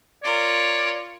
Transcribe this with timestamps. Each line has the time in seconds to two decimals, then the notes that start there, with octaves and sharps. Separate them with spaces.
0.24 F4 A#4 C#5 D5